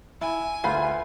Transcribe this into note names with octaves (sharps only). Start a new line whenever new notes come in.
E4 G#5
D2 F4 B4 F5 B5